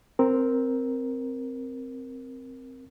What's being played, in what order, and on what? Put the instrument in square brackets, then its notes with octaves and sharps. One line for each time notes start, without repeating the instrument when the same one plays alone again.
[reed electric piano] C4 A#4